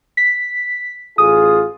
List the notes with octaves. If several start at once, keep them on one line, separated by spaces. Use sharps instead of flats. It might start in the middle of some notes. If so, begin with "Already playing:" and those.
B6
A1 F4 G#4 D#6